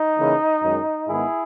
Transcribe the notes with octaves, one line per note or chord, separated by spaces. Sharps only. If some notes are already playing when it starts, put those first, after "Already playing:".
Already playing: D#4
C#3 E3 A#3
F#2 D#3 G#3
G#2 D#3 G#3 B3 E4 G#4